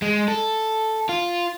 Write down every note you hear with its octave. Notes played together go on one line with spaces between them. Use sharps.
G#3
A4
F4